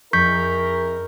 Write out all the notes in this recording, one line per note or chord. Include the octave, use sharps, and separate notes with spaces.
F2 E4 G#4 A#4 C#6 G6 B6